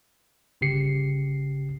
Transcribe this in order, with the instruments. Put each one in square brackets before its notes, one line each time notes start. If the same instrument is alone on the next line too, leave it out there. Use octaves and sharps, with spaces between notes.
[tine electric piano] G1 C#3 G4 C7 C#7